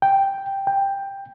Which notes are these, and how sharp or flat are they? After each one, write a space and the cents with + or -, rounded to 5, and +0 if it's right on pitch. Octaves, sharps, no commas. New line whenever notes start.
G5 +0
G5 +10